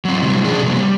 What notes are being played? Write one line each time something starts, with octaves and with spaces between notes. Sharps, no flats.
F#3 C4
C3 D#3 F#3 G3
F3 C#4 D4 G#4
C3 F#3 G3 A#3
G3